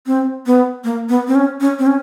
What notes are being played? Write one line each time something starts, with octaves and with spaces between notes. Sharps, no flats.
C4
B3
A#3
B3
C4
C#4
C#4
C4
C#4